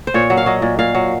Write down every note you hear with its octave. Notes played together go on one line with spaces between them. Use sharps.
C5
A#2 C#5
F#3
F5
F#3 D#5
A#2
A#2 F5
F#3